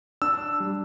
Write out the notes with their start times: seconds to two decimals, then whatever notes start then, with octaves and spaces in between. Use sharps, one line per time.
0.22 D4 E6
0.60 G3